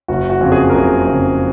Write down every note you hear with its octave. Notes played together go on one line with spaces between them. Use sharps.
F#1 F#4
F#4
F2 C#3
G#4
A#4
F#1 G#4
F2 C#3